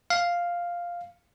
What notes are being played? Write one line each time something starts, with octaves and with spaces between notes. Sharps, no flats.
F5